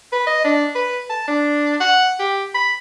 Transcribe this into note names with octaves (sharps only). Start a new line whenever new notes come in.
B4
D#5
D4
B4
A5
D4
F#5
G4
B5